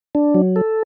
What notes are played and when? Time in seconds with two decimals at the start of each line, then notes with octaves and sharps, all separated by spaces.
0.15 D4
0.34 F#3
0.56 A4